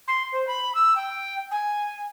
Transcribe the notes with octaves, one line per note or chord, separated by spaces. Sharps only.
C6
C5
B5
E6
G5
G#5